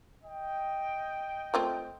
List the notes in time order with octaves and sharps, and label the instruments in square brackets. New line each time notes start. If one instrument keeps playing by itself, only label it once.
[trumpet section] D#5 G5
[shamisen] A3 C4 F4